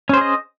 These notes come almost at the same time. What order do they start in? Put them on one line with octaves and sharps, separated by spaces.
C#4 C5 G#4 D#5